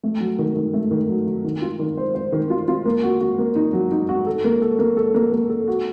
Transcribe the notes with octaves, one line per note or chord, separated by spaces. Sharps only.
A3
F#3
D#3
D#3
A3
D#3
F#3
F#3
D#3
F4
D#3
C5
C5
D#3
F4
F4
A#3
F#4
F#4
A#3
D#4
F#3
D#4
F#4
A4
A#3
A4
A#3
A4
A#3
A#3
A4
F#4